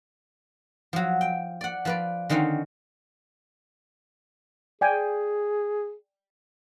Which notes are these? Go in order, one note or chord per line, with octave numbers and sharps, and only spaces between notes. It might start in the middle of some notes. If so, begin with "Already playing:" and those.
F3 F#3
G5
D5 F#5
F3 B4 D5
D3 D#3 C4 C#4 D#4
G#4 D5 G5 G#5